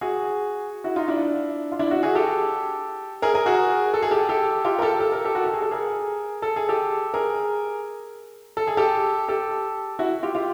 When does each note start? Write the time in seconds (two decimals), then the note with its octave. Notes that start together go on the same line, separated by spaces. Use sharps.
0.01 F#4 G#4
0.84 E4 F#4
0.96 D#4 F4
1.08 D4 E4
1.72 F4
1.79 D4 E4
1.91 E4 F#4
2.03 F#4 G#4
2.15 G4 A4
3.22 G#4 A#4
3.34 G#4 A#4
3.46 F#4 G#4
3.94 A4
4.02 G#4
4.11 G4 A4
4.29 G4 A4
4.65 F4 G4
4.79 A#4
4.82 G4 A4
5.00 A4
5.12 A#4
5.25 G4 A4
5.35 F#4
5.44 G4
5.54 G#4
5.62 A4
5.71 G#4 A#4
6.42 A4
6.56 G#4
6.69 G4 A4
7.14 G#4 A#4
8.57 A4
8.67 G#4
8.77 G4 A4
9.28 G4 A4
9.99 E4 F#4
10.23 F4 G4
10.35 F4 G4